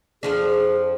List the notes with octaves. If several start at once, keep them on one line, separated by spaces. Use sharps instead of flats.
F2 F3 D4 G#4